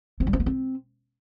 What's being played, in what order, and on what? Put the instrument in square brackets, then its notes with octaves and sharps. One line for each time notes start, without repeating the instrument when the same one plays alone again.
[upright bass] C4
G3
C4
A#3
C4